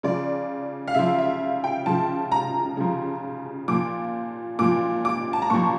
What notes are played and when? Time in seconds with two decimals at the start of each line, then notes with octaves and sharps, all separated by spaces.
0.03 C#3 F3 D5
0.88 F5
0.95 C#3 F3 E5
1.18 E5
1.64 G5
1.86 C#3 F3 A5
2.32 A#5
2.77 C#3 F3
3.68 A#2 F3 D6
4.59 A#2 F3 D6
5.05 D6
5.33 A5
5.42 A#5
5.50 A#2 F3 C#6